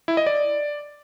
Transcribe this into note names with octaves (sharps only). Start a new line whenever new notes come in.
E4
D#5
D5